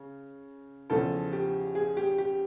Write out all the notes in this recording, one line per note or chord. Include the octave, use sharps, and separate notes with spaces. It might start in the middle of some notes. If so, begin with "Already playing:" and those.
Already playing: C#3
E2 C#3 F3 A4
G4
G#4
G4
G4